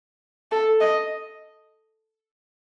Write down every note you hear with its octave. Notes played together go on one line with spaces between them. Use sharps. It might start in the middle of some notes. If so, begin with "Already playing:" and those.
A4
D#5